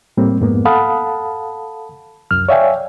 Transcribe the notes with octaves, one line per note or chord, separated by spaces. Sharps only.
A2 G3 A#3 C4
F2 G#2 A#3 B3
A4 F5 F#5 A5 B5 D#6
C2 F#2 F6
C#5 D5 E5 F5 G5 G#5